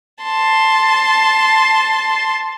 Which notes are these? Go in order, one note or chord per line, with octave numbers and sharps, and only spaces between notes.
A5 C6